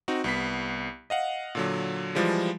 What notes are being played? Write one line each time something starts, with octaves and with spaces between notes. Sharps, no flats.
C4 D#4 F#4
C2 B3 B6
D#5 F5 F#5
A#2 D3 F#3
E3 F3 G3 G#3